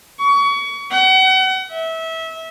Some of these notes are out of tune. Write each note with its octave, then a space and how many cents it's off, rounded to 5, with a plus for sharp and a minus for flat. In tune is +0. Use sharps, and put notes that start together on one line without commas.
C#6 +30
F#5 +35
E5 -25